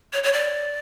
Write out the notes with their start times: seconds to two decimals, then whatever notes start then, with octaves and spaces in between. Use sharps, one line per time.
0.13 C#5
0.23 C#5
0.33 D5